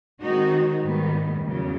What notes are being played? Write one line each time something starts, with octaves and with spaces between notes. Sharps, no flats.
D#3 G#3 C4 D#4 F#4
G#2 D#3 G3 B3
E2 C#3 F#3